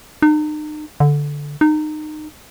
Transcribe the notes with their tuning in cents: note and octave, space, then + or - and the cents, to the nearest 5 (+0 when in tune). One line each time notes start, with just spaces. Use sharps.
D#4 -40
D3 -10
D#4 -25